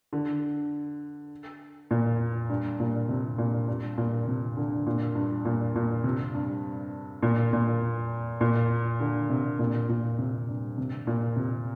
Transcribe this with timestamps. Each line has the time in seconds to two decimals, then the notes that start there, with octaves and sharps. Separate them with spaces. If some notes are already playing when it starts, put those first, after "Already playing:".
0.13 D3
1.91 A#2
2.49 G2
2.80 A#2
3.09 C3
3.38 A#2
3.68 G2
3.98 A#2
4.27 C3
4.57 D3
4.87 A#2
5.15 G2
5.45 A#2
5.76 A#2
6.04 C3
6.35 G2
7.23 A#2
7.53 A#2
8.41 A#2
9.00 D3
9.30 C3
9.59 A#2
9.89 A#2
10.19 C3
10.48 G2
10.78 C3
11.07 A#2
11.37 C3